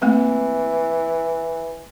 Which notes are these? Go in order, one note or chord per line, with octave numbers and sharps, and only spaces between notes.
E3 A3 A#3 C4